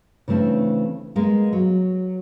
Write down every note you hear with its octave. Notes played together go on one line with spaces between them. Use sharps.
C#3 E3 A3 C4 D4
G#3 A#3 B3 A#4
F#3